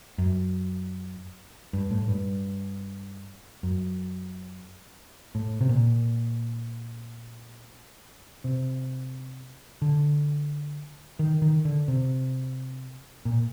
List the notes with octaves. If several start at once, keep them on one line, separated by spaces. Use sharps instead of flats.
F#2
G2
A2
G2
F#2
A2
C3
A#2
C3
D3
D#3
D#3
D3
C3
A#2